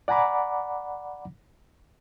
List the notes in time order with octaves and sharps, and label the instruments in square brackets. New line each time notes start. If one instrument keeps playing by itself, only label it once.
[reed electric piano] D5 F#5 G#5 A#5 B5 D6